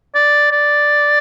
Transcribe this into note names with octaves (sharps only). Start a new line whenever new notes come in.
D5
D5